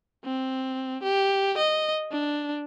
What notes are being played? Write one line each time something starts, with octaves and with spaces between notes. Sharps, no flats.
C4
G4
D#5
D4